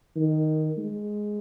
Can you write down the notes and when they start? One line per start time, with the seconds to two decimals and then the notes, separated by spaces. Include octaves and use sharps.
0.16 D#3
0.78 G#3